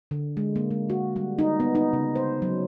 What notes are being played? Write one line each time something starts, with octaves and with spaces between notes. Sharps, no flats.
D3
G#3
A#3
G#3
F#4
G3
D#4
B3
D#4
C#3
C5
F#3